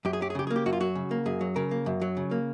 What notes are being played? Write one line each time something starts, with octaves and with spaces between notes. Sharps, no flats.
F#2 G4
G#4
F#3 G4
G#4
C#3 G4
G#4
A#3
G4
F#2 F#4
F4
F#3 F#4
C#3
A#3
F#2 G#4
F#3
C#3 A#4
A#3
F#2
F#3
C#3
A#3